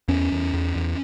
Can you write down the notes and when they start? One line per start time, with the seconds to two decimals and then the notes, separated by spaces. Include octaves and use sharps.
0.08 E2 C#4
0.32 E2
0.54 E2
0.75 E2